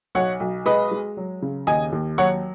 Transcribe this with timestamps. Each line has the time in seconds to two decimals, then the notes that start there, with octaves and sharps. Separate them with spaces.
0.15 B1 C#5 F#5
0.40 B1
0.66 G#3 B4 D#5
0.91 G#3
1.17 F#3
1.42 C#3
1.67 D#2 D#5 G#5
1.92 D#2
2.18 F#3 C#5 F#5